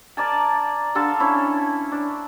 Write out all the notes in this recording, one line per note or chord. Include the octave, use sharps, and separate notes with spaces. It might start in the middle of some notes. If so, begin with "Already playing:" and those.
A#4 D5 G#5 A5
D3 A4 F5 A5
C#4 E4
D4